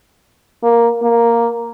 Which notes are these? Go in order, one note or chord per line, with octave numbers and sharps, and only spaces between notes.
A#3
A#3